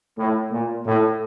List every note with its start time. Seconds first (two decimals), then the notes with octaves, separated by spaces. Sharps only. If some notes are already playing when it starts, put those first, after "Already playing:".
0.17 A2
0.51 A#2
0.86 A2